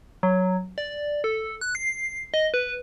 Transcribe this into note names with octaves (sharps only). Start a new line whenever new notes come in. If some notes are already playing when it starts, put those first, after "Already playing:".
F#3
D5
A4
F#6
C7
D#5
B4